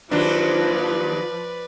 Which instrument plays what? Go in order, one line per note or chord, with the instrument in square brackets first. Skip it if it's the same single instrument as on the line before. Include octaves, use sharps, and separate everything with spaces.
[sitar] D#2 F#3 D4 [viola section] F3 [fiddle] B4 D5